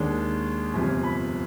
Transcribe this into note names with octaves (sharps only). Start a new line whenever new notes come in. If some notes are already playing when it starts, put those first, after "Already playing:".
Already playing: D#2 D#3 G#3 D4
G1 F2 C3 F3 G#5
B5